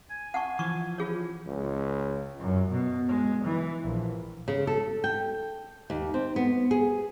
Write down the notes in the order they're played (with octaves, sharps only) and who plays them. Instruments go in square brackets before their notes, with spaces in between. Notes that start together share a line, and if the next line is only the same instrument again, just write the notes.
[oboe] G#5
[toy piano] F#5 A5 C#6
[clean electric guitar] E3 F3 [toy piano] C#6
[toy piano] F4 G#4 C#5
[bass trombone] C#2
[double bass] F#2
B2
G#3
E3
A#1
[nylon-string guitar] C#3
A4
G5
D#2
C4
B3
G#4